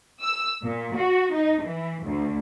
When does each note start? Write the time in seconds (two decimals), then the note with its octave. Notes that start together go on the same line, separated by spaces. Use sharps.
0.22 E6
0.63 A#2
0.96 F#4
1.33 D#4
1.61 E3
2.04 D2